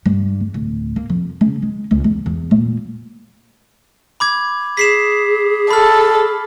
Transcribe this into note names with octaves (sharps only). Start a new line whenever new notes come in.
G2
E2
D1
A#3
F2
C#3
G#3
C#2
E2
E2
A#2
B5 D6 G#6
G#4 B6 C7 E7
A4 B5 F6